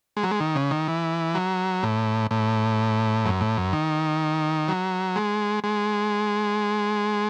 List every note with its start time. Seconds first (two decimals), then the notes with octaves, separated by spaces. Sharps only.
0.17 G#3
0.23 F#3
0.31 G#3
0.40 D#3
0.55 C#3
0.71 D#3
0.88 E3
1.34 F#3
1.83 A2
2.31 A2
3.25 F#2
3.41 A2
3.57 F#2
3.73 D#3
4.68 F#3
5.16 G#3
5.64 G#3